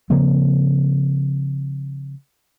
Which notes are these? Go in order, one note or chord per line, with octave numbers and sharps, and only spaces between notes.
C#3 F3 A#3 C4